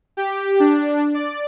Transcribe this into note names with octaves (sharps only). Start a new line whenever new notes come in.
G4
D4
D5